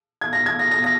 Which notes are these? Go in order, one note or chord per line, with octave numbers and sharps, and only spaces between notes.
G#6
A#6
G#6
A#6
A#6
A#6